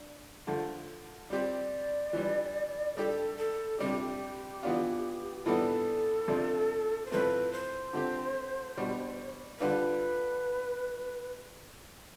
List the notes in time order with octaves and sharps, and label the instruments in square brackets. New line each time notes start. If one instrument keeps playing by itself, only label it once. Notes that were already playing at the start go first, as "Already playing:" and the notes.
Already playing: [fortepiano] D4
D3 F3 A3
[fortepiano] G3 C4 G4 [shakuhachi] D5
[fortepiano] E3 G3 D4
[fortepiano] G3 D4 G4 [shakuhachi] A4
[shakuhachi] A4
[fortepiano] C3 G3 D4 [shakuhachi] G4
[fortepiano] E3 B3 D4 F4
[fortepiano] A2 E3 G3 B3 D4 [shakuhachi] A4
[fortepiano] C3 F3 A3 D4
[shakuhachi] C5
[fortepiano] A2 F3 A3 C4 [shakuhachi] B4
[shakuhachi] C5
[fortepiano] D3 A3 C4 G4
B2 G3 D4
[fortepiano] D3 G3 D4 F4 [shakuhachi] B4